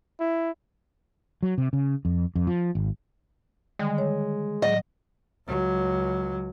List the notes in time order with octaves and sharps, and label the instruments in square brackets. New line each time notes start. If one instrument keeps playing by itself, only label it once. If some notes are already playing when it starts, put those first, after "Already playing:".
[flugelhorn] E4
[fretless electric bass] F#3
C3
C#3
F2
F2
F3
G#1
[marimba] D3 D#3 G3 [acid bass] G#3
[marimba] C#5
[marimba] A2 F#3 [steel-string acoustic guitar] D#5
[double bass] C#2 F#3